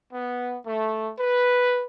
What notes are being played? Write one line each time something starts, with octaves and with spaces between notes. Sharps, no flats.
B3
A3
B4